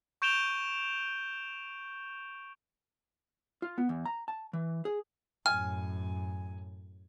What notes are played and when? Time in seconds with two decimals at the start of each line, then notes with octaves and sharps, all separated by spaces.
0.22 C#6 G6 D7 E7 F7 G7
3.62 F4
3.78 B3
3.89 E2
4.05 A#5
4.28 A5
4.53 E3
4.85 G#4
5.46 F#2 A2 G#5 F6